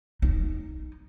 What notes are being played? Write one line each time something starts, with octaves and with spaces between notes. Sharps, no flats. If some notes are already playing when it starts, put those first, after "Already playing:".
D#4